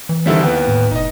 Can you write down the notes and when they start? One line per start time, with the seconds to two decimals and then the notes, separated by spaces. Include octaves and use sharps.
0.09 E3
0.26 D3 D#3 G3 C4 E4 A4
0.43 D#2 B3
0.68 A2
0.91 F1 D#4 D#5